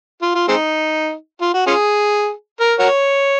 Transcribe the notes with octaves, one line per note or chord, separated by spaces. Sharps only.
F4
F4
G#3 C4 D#4
F4
F#4
C#4 F4 G#4
A#4
F#4 A#4 C#5